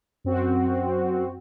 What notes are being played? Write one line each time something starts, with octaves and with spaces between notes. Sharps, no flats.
F#2 C4 F#4